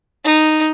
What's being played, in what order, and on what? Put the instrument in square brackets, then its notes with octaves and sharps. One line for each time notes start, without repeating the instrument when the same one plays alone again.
[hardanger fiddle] D#4